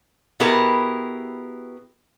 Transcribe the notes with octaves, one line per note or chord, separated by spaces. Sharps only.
B2 B3 E4 G4 G#4 A#4